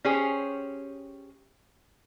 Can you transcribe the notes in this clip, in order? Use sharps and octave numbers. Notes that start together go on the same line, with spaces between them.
C#4 G4 G#4 C5 C#5